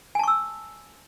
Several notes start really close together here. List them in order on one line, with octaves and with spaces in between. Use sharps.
G#5 A5 C#6 E6